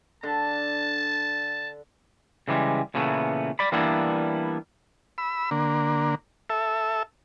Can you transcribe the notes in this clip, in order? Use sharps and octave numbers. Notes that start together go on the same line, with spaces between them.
D3 A5
C#3 E3 G3 G#3
A#2 C#3 E3 A3 B3
D5 B5
E3 G3 A#3 B3 D4 E4
B5 E6
D3 A#3
A4 E5